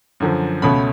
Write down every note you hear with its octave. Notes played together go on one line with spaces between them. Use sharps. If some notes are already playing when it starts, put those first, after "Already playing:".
F#2 D3 F3
C#2 B2 A3 C#4 B5